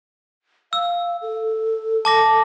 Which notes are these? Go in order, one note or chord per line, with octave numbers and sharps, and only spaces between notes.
F5 E6
A4
A5 D6 A#6